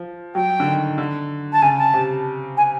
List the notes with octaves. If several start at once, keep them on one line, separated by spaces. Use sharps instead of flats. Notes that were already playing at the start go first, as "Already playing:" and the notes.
Already playing: F3
F#3 G5
D3
D#3
D3
A5
C#3 G#5
A5
C3
G#5